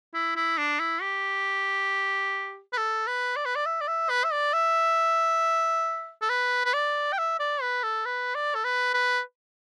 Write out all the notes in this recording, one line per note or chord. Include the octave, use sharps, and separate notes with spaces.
E4
E4
D4
E4
G4
B4
A4
B4
D5
B4
D5
E5
D5
E5
B4
E5
D5
E5
A4
B4
B4
D5
G5
E5
D5
B4
A4
B4
D5
A4
B4
B4